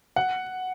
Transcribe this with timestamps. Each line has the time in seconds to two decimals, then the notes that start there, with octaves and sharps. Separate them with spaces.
0.16 F#5